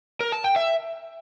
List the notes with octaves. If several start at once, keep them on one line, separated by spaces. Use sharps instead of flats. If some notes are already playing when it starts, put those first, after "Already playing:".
A#4
A5
G5
E5